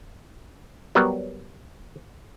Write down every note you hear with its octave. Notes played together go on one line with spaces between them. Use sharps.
F#3 G3 B3 A#4 C#5